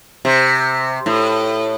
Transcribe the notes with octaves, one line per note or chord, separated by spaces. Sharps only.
C3
A2